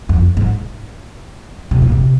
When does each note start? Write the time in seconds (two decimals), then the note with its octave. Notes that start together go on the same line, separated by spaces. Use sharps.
0.09 F2
0.37 G#2
1.71 C3
1.82 A#2
1.92 C3